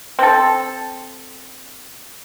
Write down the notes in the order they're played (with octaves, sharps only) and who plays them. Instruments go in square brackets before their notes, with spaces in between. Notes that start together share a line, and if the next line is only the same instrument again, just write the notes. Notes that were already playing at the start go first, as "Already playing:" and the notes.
[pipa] C4 A4